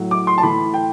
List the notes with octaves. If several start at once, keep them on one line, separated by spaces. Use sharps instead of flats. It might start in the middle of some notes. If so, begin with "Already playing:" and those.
Already playing: A2 F#3
D6
C6
A5
A2 E3 B5
G5